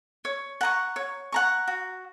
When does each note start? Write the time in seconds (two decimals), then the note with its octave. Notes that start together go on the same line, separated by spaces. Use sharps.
0.25 C#5
0.61 F#5 A#5 C#6
0.96 C#5
1.32 F#5 A#5 C#6
1.68 F#4